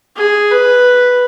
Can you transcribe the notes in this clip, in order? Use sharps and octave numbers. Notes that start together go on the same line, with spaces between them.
G#4
B4